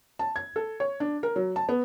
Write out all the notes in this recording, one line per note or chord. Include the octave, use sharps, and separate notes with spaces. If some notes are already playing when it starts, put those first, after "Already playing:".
A5
G#6
A4
C#5
D4
A#4
F#3
A5
B3